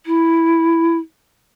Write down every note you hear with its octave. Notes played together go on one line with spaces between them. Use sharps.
E4